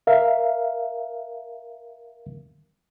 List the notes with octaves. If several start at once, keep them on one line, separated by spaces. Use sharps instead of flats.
A#4 E5 F5